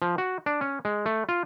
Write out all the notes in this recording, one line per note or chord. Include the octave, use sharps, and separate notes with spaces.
F3
F#4
D4
C#4
G#3
A3
F4